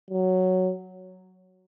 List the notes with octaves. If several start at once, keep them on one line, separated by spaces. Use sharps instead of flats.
F#3